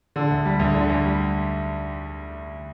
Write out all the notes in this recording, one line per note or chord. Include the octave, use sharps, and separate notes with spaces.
D3
D2
G3
D2
D3
D2
G3